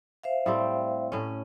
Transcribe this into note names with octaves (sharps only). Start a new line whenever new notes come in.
C5 E5 F5
A2 G3 C4
A2 C#4